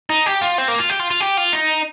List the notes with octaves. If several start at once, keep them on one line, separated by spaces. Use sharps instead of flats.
D#4
G4
F4
C4
A#3
F4
G4
F4
F4
G4
F4
D#4